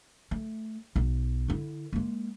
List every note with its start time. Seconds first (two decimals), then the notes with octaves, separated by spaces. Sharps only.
0.31 A3
0.96 B1
1.48 D3 E4
1.93 G#3 A#3